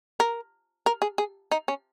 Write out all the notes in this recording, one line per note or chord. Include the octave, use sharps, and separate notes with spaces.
A#4
A#4
G#4
G#4
D#4
C#4